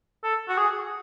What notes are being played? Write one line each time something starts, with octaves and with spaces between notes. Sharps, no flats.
A4
F#4
G#4